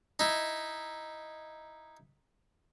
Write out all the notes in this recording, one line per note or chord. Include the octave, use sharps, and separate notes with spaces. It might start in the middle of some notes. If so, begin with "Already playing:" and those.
D#4 E4